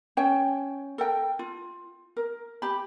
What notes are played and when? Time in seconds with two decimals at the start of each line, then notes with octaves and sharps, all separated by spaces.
0.17 C#4 C#5 G5
0.98 A4 A#4 G5
1.39 F4
2.17 A#4
2.62 G4 B5